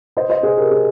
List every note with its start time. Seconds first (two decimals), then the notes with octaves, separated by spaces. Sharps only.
0.17 C5 D#5
0.30 C5 D#5
0.43 G#4 C5
0.57 G4 A#4
0.71 G#4